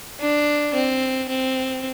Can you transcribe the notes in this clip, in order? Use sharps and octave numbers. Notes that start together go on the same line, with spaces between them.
D4
C4
C4